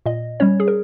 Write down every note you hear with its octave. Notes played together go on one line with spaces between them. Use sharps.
A#2 D#5
G3 C#4 C#5
G#4
A#4